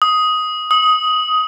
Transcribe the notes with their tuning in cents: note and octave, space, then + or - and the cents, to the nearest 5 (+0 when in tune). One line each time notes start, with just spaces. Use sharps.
D#6 +10
D#6 +15